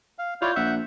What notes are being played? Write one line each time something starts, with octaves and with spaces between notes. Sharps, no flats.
F5
E4 F4 C#5 D5 G6
A#1 E5 F#5